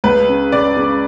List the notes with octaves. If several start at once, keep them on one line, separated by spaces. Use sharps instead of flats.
C#2 B4
C#3
C#3 D5
C#3